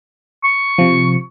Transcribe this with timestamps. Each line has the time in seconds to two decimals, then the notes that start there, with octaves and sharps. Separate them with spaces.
0.44 C#6
0.78 C3 F3